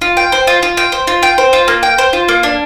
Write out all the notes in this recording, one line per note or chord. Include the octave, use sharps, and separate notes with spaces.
F4
G5
C5
F4
F4
G5
C5
F4
G5
C5
F4
A#3
G5
C5
F4
A#3
D4